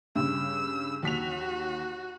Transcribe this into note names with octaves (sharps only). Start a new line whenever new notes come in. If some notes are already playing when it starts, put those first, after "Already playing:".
G2 C#3 E6
D#2 F#4 B6 F7